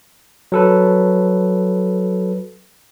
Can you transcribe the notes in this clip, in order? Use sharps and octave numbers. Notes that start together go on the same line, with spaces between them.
F#3 A4 B4